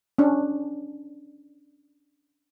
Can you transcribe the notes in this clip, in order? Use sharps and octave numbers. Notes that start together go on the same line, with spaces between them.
C#4 D4